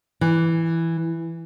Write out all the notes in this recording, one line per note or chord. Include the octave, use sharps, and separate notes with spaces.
E3